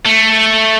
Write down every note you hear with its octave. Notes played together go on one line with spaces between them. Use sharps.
A3